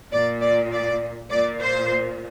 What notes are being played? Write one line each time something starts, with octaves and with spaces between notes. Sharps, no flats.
A#2 D5
D5
D5
A#2 D5
C5